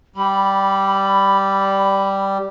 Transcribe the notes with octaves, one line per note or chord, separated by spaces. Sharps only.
G3 B5